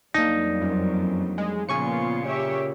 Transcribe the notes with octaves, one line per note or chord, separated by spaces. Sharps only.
F2 F#3 G3 A#3 D4 D#4
F#2
G#3
A#2 C#3 F3 B3 F4 G#5 C#6 C#7
G4 C#5 E5